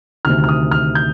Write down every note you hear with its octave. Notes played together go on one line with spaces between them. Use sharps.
D2 C3 D#3 F6
F6
D#6
F6
G6